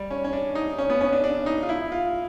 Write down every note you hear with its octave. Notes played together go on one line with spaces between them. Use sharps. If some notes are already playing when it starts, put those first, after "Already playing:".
Already playing: G3
C#4
C#4
D4
D#4
C#4
B3
C#4
D4
D4
D#4
F4
E4
F4